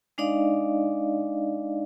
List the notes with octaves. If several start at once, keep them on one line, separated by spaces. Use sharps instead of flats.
G#3 D4 D#4 D5 D#5 F5